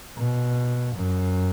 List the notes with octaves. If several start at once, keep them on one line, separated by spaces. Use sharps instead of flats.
B2
F#2